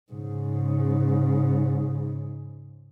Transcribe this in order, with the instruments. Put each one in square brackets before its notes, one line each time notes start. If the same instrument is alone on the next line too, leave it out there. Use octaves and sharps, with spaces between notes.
[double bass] G#2 C#3